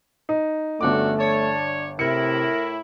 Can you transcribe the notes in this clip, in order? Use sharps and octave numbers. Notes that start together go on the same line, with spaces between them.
D#4
G1 A3 C#4 D4 F#4 A4 D6
D4 C#5 A5
A2 C3 E4 A#4 C#7